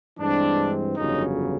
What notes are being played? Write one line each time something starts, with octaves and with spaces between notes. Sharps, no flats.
G2 E3 G#3 C4 D4
G1 F2 C#3 F#3 D#4